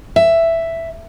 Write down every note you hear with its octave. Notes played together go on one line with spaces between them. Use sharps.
E5